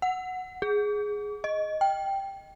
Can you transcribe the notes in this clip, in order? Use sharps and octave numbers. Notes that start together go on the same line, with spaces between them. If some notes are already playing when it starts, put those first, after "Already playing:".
F#5
G#4
D#5
G5